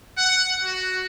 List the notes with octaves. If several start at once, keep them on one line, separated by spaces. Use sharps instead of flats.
F#5
F#4